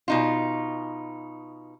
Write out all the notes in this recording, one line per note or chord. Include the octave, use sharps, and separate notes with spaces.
B2 D#4 F4